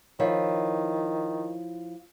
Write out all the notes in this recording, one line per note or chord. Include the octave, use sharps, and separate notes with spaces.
D#3 F3 E4 C#5